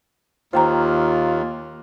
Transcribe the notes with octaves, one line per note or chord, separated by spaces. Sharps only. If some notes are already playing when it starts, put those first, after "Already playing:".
D#2 F4 C5 G5 A#5